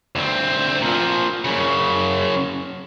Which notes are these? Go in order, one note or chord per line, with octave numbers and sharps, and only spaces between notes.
D2 C4
A#2 F3
F#2 C#3